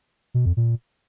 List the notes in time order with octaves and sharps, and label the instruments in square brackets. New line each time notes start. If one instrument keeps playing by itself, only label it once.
[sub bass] B2
F2
A#2